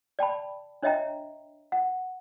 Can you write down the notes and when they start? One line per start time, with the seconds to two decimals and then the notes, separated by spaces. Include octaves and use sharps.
0.19 D5 G5 A5 B5
0.83 D4 C#5 D#5 E5 G5 A#5
1.72 F#5